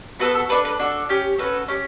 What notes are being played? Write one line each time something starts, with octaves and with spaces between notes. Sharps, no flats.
B3 F#4 A4 B4
A4
D4 A4 B4
B4
D4 F#4 A4
C#4 G4
C#4 F#4 A4 B4
C#4 G4